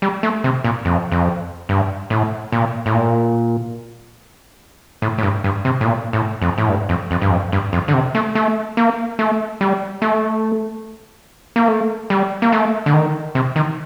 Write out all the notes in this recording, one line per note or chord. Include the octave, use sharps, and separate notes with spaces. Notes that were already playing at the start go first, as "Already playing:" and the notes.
G3
A3
C3
A#2
F2
F2
G2
A2
A#2
A2
A#2
A2
A2
G2
G2
C3
A2
A#2
A2
F2
A2
G2
F2
F2
G2
F2
G2
F2
D3
C3
A3
A3
A#3
A3
G3
A3
A#3
A3
G3
A#3
A3
D3
D#3
C3
D#3